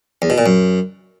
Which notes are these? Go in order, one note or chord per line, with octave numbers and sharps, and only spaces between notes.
E2
B2
A#2
F#2